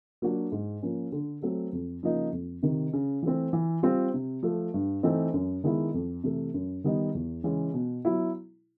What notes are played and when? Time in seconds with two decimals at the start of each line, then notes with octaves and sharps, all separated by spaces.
0.22 F#3 A#3 D4 F#4
0.52 G#2
0.82 F3 A#3 C#4
1.12 D3
1.42 F#3 A3 C4
1.72 F2
2.03 C#3 F3 A#3 D#4
2.32 F2
2.63 C3 D#3
2.93 C#3
3.22 E3 A3 C4
3.53 E3
3.83 G3 C4 F4
4.14 C3
4.43 F3 A3
4.74 G2
5.03 E3 A3 C4 D#4
5.33 F#2
5.64 D#3 G#3 B3 E4
5.94 F2
6.24 C3 E3 A3
6.54 F#2
6.84 D#3 G3 B3 D#4
7.15 E2
7.44 C#3 E3 G#3 C#4
7.74 B2
8.05 F#3 B3 E4